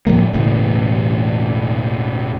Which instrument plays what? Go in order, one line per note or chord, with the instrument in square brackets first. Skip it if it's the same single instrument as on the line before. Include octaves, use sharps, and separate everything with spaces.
[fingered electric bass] A2 F3 G3 A#3
E1 A2 C#3 E3